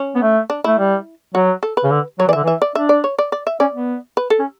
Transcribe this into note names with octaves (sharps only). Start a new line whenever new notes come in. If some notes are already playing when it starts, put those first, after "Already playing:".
Already playing: C#4
B3
A3
D4
A3 E4
G3
F#3 F#4
A4
B4
C#3
D3
F#3 C#5
E3 D5
D3 E5
E3 E5
D5
D4 E5
D5
C#5
D5
D5
E5
C#4 D5
B3
B4
A4
C#4